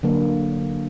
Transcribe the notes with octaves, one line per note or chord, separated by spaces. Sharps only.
D3 F#3 A#3